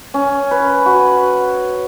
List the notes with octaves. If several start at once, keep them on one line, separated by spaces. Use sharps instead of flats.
C#4
B4
F#4